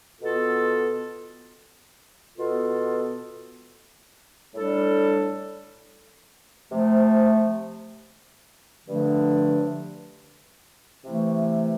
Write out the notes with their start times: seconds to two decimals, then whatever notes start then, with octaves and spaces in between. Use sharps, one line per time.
0.20 B2 B3 F4 A4
2.37 B2 B3 F4 A4
4.53 A2 G3 D4 A4
6.70 C3 F3 A3
8.86 G2 D3 F3 A3 D4
11.03 C3 E3 A3 E4